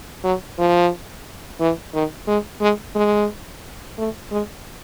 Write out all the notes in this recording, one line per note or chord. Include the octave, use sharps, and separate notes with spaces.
F#3
F3
E3
D#3
G#3
G#3
G#3
A3
G#3